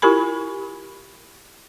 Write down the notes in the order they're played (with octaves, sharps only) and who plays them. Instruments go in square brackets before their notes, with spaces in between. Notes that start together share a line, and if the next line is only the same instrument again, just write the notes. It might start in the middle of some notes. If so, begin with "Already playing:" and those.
[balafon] E4 F4 G4 A#4 G#5 B5